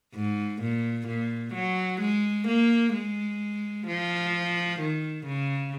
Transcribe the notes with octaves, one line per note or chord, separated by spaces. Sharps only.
G#2
A#2
A#2
F#3
G#3
A#3
G#3
F3
D#3
C#3